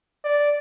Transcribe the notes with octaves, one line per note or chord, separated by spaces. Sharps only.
D5